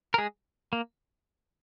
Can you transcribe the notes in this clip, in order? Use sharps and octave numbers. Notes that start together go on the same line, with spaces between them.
A#4
G#3 G#4
A#3